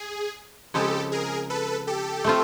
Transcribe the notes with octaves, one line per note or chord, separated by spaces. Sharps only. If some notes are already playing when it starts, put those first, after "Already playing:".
Already playing: G#4
C#3 F3 G#3 C4 G4 A4
G#4 A#4
A4 B4
G4 A4
A3 C4 F4